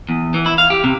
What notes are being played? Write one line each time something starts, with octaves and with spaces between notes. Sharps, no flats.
E2
E3
E4
F5
G4
C3